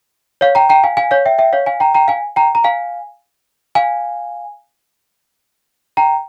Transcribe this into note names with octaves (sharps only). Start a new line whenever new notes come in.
C#5 F5
G5 A#5
G5 A#5
F5 G#5
F5 G#5
C#5 F5
E5 G5
E5 G5
C#5 F5
F5 G#5
G5 A#5
G5 A#5
F5 G#5
G5 A#5
A#5
F5 G#5
F5 G#5
G5 A#5